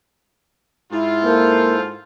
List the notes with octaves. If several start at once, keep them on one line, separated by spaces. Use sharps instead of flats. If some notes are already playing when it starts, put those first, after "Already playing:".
G#2 E4 F4
A#3 A4 C5